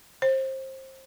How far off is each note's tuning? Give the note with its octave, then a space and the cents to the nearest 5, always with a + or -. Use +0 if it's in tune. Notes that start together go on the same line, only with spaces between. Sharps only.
C5 +25